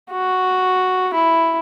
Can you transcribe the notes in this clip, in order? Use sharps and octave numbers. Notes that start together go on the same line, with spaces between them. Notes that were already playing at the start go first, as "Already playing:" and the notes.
F#4
E4